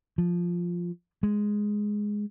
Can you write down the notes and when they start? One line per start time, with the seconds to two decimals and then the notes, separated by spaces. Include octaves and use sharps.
0.18 F3
1.23 G#3